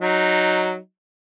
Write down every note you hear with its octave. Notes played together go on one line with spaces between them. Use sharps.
F#3 D#4